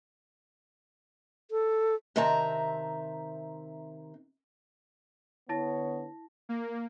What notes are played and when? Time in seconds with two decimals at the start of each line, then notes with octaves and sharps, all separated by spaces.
1.51 A4
2.16 C3 D#3 C4 E5 A5 A#5
5.49 D3 B3 E4 C#5 A5 A#6
6.49 A#3